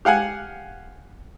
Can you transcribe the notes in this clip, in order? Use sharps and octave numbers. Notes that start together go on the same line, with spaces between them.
G4 F5 F#5 G#5